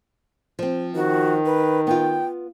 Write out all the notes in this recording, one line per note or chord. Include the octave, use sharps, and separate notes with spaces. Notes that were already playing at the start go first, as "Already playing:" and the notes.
F3 C4
D#3 F#4
B4
B3 F4 G5